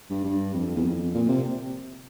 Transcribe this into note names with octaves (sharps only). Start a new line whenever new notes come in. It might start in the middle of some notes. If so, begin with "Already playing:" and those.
G2
G2
F2
E2
F2
A#2
C3